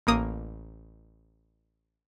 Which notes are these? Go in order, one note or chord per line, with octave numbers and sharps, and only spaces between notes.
A1 A#3 D#6